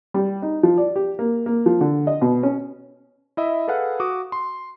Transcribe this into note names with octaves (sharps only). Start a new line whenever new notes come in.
G3
D#4
F3
D5
G4
A#3
A#3
F3
D3
D#5
B2
C#4
E4 D#5 E5
G#4 A4 B4 F5 F#5
F#4 D6 D#6
C6